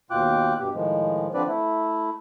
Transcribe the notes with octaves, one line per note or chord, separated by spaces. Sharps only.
D#2 B2 F4 G5 D6 F#6
G2 B2 G4
A2 D#3 F3 G#3
D3 F3 C4 D4 B4 D5
A3 E4